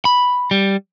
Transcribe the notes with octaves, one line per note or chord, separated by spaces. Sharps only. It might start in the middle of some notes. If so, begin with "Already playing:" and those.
B5
G3